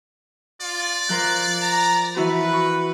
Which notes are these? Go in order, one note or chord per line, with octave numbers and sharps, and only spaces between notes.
F4 D5
F3 A#4 C5 F#6
A#5
E3 E4 F#4 B4
C#6